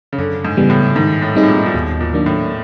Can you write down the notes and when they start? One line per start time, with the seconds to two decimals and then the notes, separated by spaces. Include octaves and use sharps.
0.13 C#3
0.18 F#2 D3
0.45 G#2
0.57 C#3 E3 G3 B3
0.70 A2
0.96 G#2 D#3
1.22 A2
1.35 G3 C4 D#4 G#4
1.43 A2
1.48 A#2
1.66 A#2
1.74 D#2 B2
2.01 A#2
2.13 D#3 F#3 A#3 D4
2.26 A2